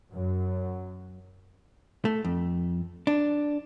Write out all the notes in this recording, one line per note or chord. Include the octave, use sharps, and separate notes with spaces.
F#2 F#3
A3
F2
D4